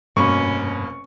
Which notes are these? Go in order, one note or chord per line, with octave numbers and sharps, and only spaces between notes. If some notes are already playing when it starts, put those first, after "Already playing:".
F1 G2 B2 A#3 C#4 B5 C#6